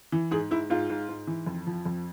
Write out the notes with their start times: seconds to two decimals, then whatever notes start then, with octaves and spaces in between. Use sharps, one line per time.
0.12 E3
0.31 G#2 G#4
0.51 G#2 E4
0.70 G#2 F4
0.90 G#2
1.09 G#2
1.27 E3
1.46 F2
1.67 F3
1.85 F2